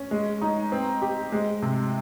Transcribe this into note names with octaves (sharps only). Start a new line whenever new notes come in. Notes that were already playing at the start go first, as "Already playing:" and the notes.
Already playing: C#4
G#3
D#4
C4
G4
G#3
C3